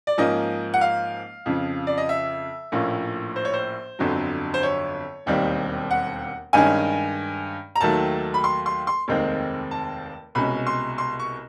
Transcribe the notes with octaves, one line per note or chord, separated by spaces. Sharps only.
D5
G#2 F3 A#3 C#4 D#5
F#5
F5
F2 C#3 F3
D5
D#5
E5
A#1 A2 F3 A#3 C#4
C5
C#5
C5
G1 F2 D3 F#3
C5
C#5
E1 D#2 D#3 G3 C4
F#5
G2 D#3 G#3 C#4 G#5
A#5
D#2 D#3 F#3 A3 A5
B5
C6
C6
C6
F1 D#2 D#3 G#3 C4
A5
C2 B2 G#3 C#4 B5
C6
C6
C#6